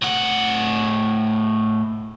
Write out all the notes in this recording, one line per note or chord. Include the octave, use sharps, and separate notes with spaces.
A2 F#5